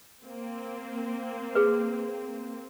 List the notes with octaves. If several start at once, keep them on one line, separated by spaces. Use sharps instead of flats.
A#3 C4
G#4 B4